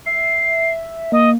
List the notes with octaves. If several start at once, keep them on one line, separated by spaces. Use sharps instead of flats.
E5 C7
A#3 D#5